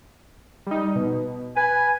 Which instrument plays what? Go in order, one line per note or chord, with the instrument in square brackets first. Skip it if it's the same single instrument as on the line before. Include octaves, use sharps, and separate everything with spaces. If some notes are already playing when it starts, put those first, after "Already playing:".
[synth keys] G3 D#4
B2
[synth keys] B4 [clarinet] G#5